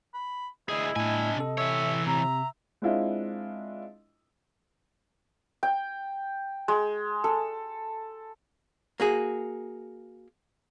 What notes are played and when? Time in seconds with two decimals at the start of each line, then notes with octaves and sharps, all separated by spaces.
0.14 B5
0.69 D2 E4 G#4 D#5
0.96 A2 D4 G#5
1.36 C3 A4
1.58 E3 C#5 E5
2.07 C3 E5 A#5
2.82 G#3 C4 D4 E4 F4 D#5
5.63 G5
6.68 G#3
7.24 A4
9.00 A#3 F#4 G#4